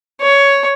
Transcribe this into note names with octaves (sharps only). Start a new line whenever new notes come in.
C#5